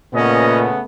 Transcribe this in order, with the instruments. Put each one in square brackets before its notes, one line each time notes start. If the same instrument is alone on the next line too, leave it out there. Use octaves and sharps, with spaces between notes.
[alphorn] A#2 [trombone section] C#3 A3 B3 [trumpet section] C#4 D#5